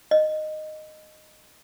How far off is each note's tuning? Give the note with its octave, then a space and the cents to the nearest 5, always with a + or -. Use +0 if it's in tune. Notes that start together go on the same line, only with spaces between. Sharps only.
D#5 -10